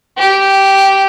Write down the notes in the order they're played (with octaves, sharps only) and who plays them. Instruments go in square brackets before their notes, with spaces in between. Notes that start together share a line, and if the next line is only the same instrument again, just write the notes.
[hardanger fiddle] G4